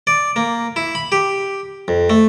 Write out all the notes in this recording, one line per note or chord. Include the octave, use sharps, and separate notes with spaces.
D5
A#3
E4
B5
G4
F2
A3